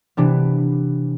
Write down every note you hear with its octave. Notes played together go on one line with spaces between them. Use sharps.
C3 E3 B3 D4